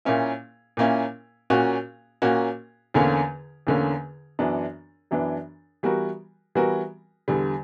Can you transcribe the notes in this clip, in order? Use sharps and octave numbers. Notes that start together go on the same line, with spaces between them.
A#2 A#3 C#4 E4
A#2 A#3 C#4 E4
A#2 A#3 C#4 F#4
A#2 A#3 C#4 F#4
E2 D3 A#3 C#4
E2 D3 A#3 C#4
F#2 E3 B3 D4
F#2 E3 B3 D4
E3 G3 B3 F#4 A#4
E3 G3 B3 F#4 A#4
E2 D3 G3